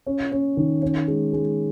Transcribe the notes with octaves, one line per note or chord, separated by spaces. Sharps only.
C#4
C#4
D#3
C#4
G#3
G#3